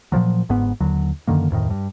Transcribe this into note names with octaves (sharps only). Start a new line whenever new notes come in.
A#2 C#3 F3 F#3
G1 G#2 B3
D#2 D3 F#3
F#2 D3 D#3 A#3
D1 F2 A2 D#3
G2